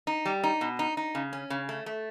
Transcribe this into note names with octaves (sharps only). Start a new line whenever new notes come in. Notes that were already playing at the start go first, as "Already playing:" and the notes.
D#4
G3
D#4
B2
D#4
D#4
C#3
C#4
C#3
A3
A3